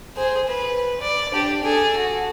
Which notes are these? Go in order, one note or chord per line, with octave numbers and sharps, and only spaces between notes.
G#4 C5
B4
D5
D4 G4
G#4 A4
F#4